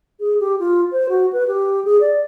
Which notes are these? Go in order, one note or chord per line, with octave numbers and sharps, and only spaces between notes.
G#4
G4
F4
C5
F#4
B4
G4
G#4
D5